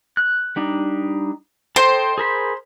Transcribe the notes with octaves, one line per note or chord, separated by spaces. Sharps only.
F#6
G3 D4 D#4
A4 C5 D#5 G5
G#4 A#4 B5